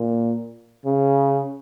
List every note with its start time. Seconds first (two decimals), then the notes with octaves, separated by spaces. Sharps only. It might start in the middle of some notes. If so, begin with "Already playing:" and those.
Already playing: A#2
0.85 C#3